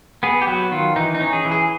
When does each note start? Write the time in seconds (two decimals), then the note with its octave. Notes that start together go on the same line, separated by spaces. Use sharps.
0.23 B3 G#4
0.42 G4
0.47 F#3 F#4
0.72 D#3 F4
0.96 E3 D#4
1.15 D#4
1.21 C#4
1.33 G#4
1.45 E3
1.51 G#4